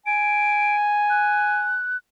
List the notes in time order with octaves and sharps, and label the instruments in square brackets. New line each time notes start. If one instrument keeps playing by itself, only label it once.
[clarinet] G#5 [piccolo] D7
[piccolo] F#6